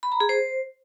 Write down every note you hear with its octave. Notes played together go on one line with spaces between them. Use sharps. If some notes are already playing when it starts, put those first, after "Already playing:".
B5
A#5
G#4
C5